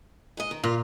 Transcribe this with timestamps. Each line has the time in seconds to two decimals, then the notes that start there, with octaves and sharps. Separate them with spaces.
0.37 G#2 G#3 D#5
0.51 D#3
0.63 A#2 F4